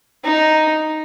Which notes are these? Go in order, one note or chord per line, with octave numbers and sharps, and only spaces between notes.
D#4